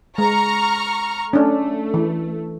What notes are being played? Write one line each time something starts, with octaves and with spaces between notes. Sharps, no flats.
G#3 A#5 C#6 F6
A3 C#4 D4
E3